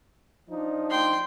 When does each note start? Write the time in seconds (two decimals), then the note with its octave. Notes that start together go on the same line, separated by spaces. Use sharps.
0.49 F3 D4 D#4
0.90 G5 C6